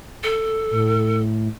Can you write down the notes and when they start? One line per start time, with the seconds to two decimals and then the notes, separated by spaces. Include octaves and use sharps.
0.24 A4
0.71 A2